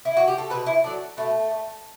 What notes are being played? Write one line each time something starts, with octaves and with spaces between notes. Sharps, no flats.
E4
F#4
G4
A4
B2 B4
E4
F#3 A3 D4
B2 A3
A3